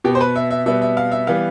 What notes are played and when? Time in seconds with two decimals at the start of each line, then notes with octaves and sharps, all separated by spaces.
0.04 B2 B3 G4
0.15 C5
0.21 B4
0.36 E5
0.51 E5
0.66 B2 G3 B3 E5
0.82 E5
0.97 F5
1.12 E5
1.27 E3 G3 B3 F5